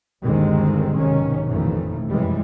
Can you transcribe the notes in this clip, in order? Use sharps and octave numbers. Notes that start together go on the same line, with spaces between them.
G1 D#2 D3 D#3 G#3 C4
B1 G#2 C3 D#3 C#4
A1 F2 B2 D#3 E3 A3
F1 F#2 E3 G3 G#3